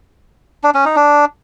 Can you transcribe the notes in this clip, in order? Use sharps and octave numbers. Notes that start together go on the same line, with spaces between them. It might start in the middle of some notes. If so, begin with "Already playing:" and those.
D4
C#4
D#4
D4